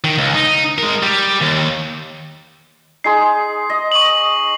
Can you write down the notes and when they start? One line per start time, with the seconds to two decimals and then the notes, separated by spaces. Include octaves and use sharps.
0.04 D#3
0.18 C#2
0.34 D#4
0.78 G#3 A#4
1.03 G3
1.41 D#2
3.04 D#4 G#4 C6 C7
3.70 D#5
3.92 C#6 F#7